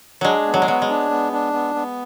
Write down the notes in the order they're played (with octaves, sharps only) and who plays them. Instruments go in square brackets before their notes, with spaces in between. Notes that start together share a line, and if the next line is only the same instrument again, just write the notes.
[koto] F#3 G#3 [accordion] D4
[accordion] B3
[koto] F#3
G#3
[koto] F#3 [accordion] B3
[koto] G#3
[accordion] D4
B3
D4
B3
B3